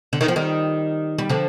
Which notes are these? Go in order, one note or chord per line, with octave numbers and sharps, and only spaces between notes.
D3
D#3
F3
D#3 G3
G3
D3 F3